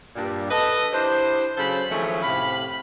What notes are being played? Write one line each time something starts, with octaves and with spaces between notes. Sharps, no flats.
G2 A#2 G3
A4 B4 D#5
D4 E4 G4 C5
C#3 F#3 A4 C5 F5 B5
D#3 F3 G#3 A3 C4 C#4
A2 C3 F5 B5